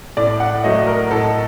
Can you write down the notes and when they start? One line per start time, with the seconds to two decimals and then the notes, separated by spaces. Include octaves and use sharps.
0.17 A2 D5
0.40 F#5
0.64 F#3 A3 D#5
0.87 A#4
1.11 A2 A4